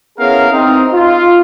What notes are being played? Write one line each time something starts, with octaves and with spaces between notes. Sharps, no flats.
B3 C#4 E4 G#4 A#4 F5
C4 D#4
F4